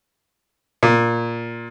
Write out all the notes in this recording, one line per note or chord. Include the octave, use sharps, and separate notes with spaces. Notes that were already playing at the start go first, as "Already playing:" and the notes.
A#2